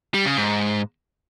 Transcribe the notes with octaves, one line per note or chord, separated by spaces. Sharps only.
G3
C#3
G#2